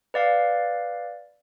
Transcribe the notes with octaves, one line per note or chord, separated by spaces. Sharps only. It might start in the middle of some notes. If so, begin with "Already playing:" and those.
B4 D5 F5